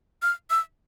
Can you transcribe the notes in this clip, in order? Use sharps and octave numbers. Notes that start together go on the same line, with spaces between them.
F6
E6